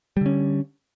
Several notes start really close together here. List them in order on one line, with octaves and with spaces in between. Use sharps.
G3 D3 C#4